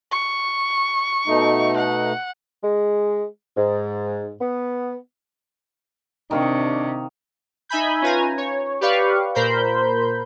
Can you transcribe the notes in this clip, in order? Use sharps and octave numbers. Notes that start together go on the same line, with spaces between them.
C#6
B2 A3 D#4
F#5
G#3
G#2
B3
C3 D#3 D4 F5 C#6
D#4 E5 G#5 B5 G6
C#4 F4 B4 G#5 A#5
C#5
G4 B4 D5 F5 C#6
A#2 A#4 C5 B5 G6